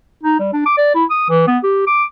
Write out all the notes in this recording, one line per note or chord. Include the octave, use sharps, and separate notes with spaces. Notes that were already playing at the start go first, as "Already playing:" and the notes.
D#4
G3
D4
D6
D5
E4
D#6
E3
B3
G4
D6